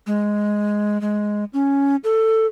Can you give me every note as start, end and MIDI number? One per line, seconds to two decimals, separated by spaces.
0.07 1.00 56
1.01 1.44 56
1.53 1.96 61
2.04 2.46 69